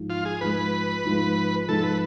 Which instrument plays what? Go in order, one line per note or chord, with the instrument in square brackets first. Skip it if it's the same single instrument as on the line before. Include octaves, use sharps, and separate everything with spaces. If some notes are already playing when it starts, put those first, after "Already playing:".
Already playing: [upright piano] G#2 F3 G#3
[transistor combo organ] F4
G#4
[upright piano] G#2 F3 G#3 [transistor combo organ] B4
[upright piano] G#2 F3 G#3
[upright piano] G#2 F3 G#3 [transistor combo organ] A4
[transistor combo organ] B4